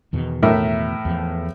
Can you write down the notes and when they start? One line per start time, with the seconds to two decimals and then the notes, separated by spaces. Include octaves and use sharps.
0.13 E2 B2 D#3
0.43 A2 A#4 E5
1.05 E2 F3